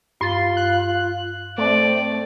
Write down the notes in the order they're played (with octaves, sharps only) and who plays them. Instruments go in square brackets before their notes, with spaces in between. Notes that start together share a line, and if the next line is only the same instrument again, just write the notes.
[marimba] G2 A6 [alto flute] F4 [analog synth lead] C6
[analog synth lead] F#6
[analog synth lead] A3 [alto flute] C4 [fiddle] D5